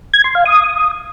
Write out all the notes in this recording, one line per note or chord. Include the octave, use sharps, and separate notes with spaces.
G#6
C6
F5
D#6